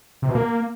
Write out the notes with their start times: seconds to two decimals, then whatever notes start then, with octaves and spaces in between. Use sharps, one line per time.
0.22 C3
0.29 B2
0.35 A#3